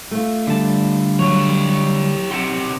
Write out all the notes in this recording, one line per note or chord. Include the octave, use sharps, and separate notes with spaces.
A3 F4
D3 G3 A5
F#3 G4 C#5
B1 C3 G4 F#5